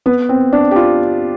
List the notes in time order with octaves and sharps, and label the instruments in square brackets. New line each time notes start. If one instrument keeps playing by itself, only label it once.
[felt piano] B3
C4
D4
G4
F4